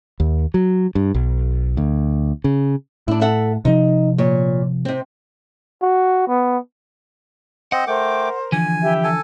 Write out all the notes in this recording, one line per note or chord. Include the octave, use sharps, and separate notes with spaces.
D#2
F#3
G2
B1
D2
C#3
A2 D4 E4
A4 E5 F#5
C3 F3 D#4
A#2 C#5
C3 C4
F#4
B3
C4 C5 D#5 F#5
A3 A#4 C5 G5 D6
D3 E3 F3 G#5
E4 G4 E5
A4 G#5